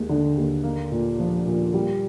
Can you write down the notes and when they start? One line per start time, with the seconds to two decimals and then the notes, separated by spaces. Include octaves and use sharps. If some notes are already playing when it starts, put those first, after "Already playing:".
Already playing: D#2 G#3
0.09 D3
0.37 D#2
0.64 A#3
0.92 A#2
1.19 F3
1.47 A#2
1.74 G3